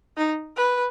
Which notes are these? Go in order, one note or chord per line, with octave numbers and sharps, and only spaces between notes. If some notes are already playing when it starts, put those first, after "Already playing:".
D#4
B4